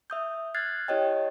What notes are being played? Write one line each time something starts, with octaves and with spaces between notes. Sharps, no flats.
E5 D#6 G6
F6 F#6 G#6 A6 C7
E4 G4 C#5 D#5 G5